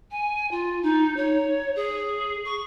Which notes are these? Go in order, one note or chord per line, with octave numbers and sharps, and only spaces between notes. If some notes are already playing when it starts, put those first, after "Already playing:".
G#5
F4
D#4
C#5
G#4
C#6